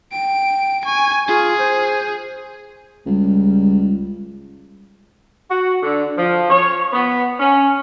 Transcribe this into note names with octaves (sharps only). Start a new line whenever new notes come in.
G5 D7
G#5 C#6
F4 G#4
C5
C#2 G3
F#4
D3
F3
C#5
B3
C#4